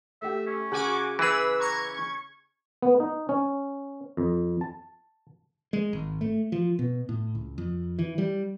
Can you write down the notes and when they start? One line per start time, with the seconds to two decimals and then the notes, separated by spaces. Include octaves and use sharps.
0.22 A3 G4 E5
0.47 C#4
0.72 C#3 F#4 G#5 D6
1.19 E3 G#4 B4 E5 E6
1.60 A#5 C#6 G#6
1.86 C#4
2.82 B3
3.00 D#4
3.29 C#4
4.17 F2
4.61 A5
5.73 G#3
5.93 G#1
6.21 A3
6.52 F3
6.79 B2
7.09 A2
7.35 C#2
7.58 F2
7.99 E3
8.18 G3